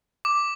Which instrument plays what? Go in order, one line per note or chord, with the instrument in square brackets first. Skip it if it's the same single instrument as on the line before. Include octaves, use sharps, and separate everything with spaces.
[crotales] D6